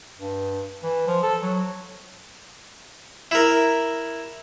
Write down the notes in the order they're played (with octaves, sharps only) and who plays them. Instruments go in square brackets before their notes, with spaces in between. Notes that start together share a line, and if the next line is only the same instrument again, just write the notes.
[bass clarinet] G2
E3
F3
A4
F#3
[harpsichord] E4 A#4